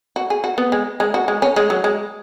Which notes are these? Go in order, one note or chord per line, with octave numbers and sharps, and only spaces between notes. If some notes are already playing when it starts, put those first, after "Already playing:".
F#4
G#4
F#4
B3
G#3
G#3
F#4
G#3
C#4
G#3
F#3
G#3